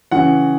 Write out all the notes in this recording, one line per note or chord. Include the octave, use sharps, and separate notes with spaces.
C#3 E3 F#5